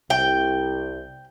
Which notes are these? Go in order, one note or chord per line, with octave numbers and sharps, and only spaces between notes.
C2 G5